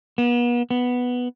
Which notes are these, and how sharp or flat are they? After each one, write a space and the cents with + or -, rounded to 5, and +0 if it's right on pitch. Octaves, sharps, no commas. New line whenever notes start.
B3 -40
B3 +0